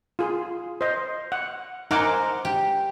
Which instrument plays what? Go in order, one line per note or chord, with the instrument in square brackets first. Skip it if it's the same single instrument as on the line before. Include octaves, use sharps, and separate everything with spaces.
[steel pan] F4 G#4
C5 D#5
F#5
[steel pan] D#4 F#5 D6 [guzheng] A#4 C5 G#5
[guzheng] G4